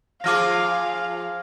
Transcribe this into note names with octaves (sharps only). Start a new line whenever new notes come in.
F3 F4 G#4 F5 D6 F6 A#6